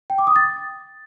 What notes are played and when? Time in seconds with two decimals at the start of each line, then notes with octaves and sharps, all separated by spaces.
0.10 G5
0.18 D6
0.27 D#6
0.36 A6